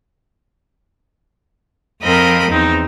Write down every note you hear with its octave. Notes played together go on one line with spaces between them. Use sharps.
F2 F3 C4 A#4 D#5 B5
E2 C4 D#4